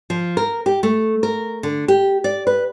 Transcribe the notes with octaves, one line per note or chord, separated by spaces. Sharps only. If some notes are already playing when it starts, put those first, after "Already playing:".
F3
A#4
G4
A3
A#4
D3
G4
D5
B4